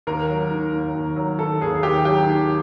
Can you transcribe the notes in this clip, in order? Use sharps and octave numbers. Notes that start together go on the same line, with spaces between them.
D#2 A#4
F#3
D#3
D#2
D#2
F#3
D#3 A4
D#2 G#4
D#2 G4
F#3 G4
D#3